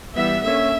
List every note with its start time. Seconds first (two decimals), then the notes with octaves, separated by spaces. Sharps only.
0.15 E3 G3 B3 E5
0.44 D3 A#3 C#4 E5